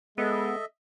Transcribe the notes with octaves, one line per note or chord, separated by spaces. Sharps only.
G#3 B3 A4 D#5 E5